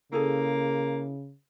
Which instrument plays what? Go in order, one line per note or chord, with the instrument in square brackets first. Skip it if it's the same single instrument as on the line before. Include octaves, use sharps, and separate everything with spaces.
[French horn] C#3 [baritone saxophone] A#3 [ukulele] E4 G#4 A4